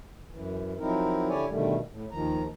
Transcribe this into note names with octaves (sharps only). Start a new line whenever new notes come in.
F#2 E3
F3 F#3 C4 D#4 E4 A#4
D3 E4 G4 C#5 D5 G#5
B2 D3 D#3 G3 A3
A2
D#2 D#3 F3 A#5